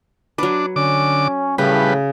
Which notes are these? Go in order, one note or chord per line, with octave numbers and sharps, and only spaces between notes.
F#3 D4 B4
D3 C#4 D6
A2 C#3 G3 B4